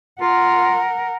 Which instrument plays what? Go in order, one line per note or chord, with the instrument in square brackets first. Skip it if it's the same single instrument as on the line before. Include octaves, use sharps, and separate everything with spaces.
[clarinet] F4 [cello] A#4 F#5